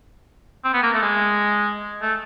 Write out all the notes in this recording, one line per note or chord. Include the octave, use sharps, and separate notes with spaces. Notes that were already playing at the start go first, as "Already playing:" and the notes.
C4
B3
A#3
A3
G#3
A3